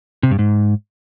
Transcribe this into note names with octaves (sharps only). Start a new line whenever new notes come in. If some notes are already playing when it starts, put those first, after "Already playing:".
C3
G2
G#2